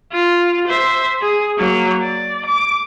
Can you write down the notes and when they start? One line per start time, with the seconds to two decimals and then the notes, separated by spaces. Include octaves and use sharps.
0.12 F4
0.67 C5 E5
1.21 G#4
1.57 F#3 A#3
2.01 D5
2.46 D6